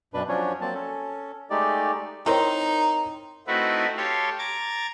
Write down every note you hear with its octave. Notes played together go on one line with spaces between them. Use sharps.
F#2 B2 D4 B4
F3 F#3 C#4 D4 C#5
F#3 A#3 C4 A5
C#4 A4
G#3 A3 D#4 G4 D5
D#3 C4 D#4 E4 A#4 C#5
A3 C4 D#4 E4 F#4 B4
G4 A4 C#5 F5 C6
A#5 D6 G#6 A6